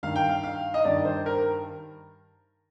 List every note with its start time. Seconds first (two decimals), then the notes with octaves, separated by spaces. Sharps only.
0.03 G2 D#3 F5
0.16 G5
0.29 F5
0.43 F5
0.74 D#5
0.85 G2 D#3 D5
1.05 C5
1.26 A#4